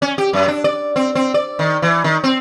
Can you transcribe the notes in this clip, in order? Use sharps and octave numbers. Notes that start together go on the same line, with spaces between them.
C#4
G4
F#2
D4
D5
C4
C4
D5
D#3
E3
D#3
C4